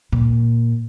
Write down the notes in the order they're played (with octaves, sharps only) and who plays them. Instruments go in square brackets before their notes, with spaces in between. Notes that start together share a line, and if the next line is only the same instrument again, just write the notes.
[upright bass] A#2